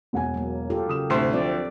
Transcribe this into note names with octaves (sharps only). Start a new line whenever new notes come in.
E1 F#5 G#5
F#3 A#3
F4 G4 A4
C#3 D#6 E7
D2 A2 C3 C5
F3 C4 D5